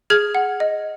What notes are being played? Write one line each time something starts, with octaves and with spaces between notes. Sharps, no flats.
G#4 F6 G#6
F#5
D#5